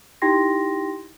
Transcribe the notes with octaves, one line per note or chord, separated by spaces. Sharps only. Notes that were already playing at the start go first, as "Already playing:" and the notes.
D#4 E4 G4 G5 C6 A#6